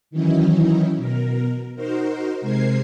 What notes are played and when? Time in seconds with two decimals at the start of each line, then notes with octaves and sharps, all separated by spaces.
0.11 D#3 E3 F#3 C#4 D#4 E4
0.96 B2 A#4
1.76 D#4 F#4 A#4 C5
2.41 C3 G#3 A#4 C5 G#6 C7